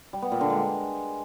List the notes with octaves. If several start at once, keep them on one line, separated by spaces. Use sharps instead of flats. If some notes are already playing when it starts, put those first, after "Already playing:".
G3
B3
A#2
D3
G#3